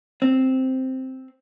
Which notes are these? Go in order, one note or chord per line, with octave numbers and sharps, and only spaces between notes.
C4